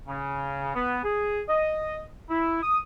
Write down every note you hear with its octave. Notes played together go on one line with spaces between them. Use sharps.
C#3
B3
G#4
D#5
E4
D#6